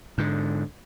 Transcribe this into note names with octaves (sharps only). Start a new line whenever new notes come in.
G#2 D3